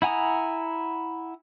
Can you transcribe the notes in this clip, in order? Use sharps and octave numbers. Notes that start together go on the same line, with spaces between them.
E4 F#5 G#5 A#5 D#6